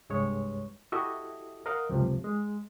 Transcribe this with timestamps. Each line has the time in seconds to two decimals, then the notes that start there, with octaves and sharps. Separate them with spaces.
0.09 C2 G2 G#3 C#5
0.92 E4 F#4 G4 A4 D#5 E5
1.66 A#4 D#5 F5 F#5
1.89 C#2 F#2 C3 F3
2.24 G#3